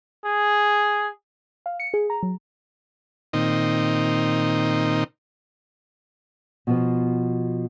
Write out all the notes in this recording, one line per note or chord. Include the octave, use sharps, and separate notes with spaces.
G#4
F5
C#7
G#4
A#5
F#3
A#2 D#3 C4 D#4
B2 F3 B3